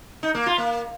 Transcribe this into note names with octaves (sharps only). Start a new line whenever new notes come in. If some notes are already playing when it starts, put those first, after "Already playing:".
D#4
A#3
F4
A#3